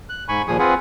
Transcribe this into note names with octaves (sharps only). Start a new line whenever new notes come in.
F#6
G#2 G#5 B5 C#6
D#2 A#2 F3 G#4 G#5 D#6
C4 F4 G#4 B4 F#5 G#5